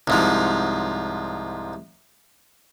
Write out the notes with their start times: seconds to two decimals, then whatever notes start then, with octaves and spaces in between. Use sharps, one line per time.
0.08 C2 G#2 F3